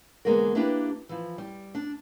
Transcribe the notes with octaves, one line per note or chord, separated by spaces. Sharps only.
E2 D3 G#3 A#3 B3 A#4
A#3 D4 E4 G4 B4
E3 F3
G3
D4